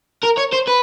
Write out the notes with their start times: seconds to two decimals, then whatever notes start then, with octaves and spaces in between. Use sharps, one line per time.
0.23 A#4
0.37 C#5
0.52 C5
0.67 B4